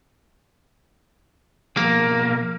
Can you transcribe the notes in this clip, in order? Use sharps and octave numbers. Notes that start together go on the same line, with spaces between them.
B2 F3 A#3 G#4